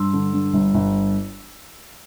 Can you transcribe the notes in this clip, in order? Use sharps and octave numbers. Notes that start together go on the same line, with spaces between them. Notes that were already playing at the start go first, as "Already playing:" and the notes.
Already playing: G2 C6 E6
D3
G2
G1
G1